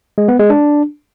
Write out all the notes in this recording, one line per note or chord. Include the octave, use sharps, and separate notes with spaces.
G#3
B3
G#3
D4